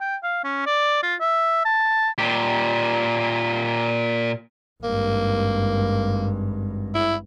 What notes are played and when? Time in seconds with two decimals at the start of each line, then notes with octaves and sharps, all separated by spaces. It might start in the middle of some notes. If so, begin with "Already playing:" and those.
0.01 G5
0.23 F5
0.44 C#4
0.66 D5
1.03 F4
1.20 E5
1.65 A5
2.18 A#2 G4
4.83 G#1 G2 A#3
6.95 E4